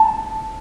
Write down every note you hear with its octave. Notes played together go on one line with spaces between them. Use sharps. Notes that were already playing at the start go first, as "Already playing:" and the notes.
Already playing: A5